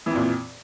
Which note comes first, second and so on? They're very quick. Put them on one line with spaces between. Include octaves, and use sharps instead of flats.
E3 F2 A#2